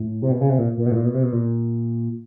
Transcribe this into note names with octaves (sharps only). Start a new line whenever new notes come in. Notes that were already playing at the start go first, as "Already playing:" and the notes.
Already playing: A2
C3
B2
C#3
C3
A#2
A#2
B2
A2
A#2
B2
C3
B2
A#2